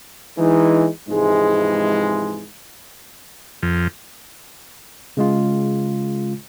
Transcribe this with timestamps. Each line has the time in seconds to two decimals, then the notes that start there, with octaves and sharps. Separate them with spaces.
0.38 E3 G#3 D#4
1.08 G#2 C3 E3 F3 G#3
3.63 F2
5.17 C#3 G#3 F4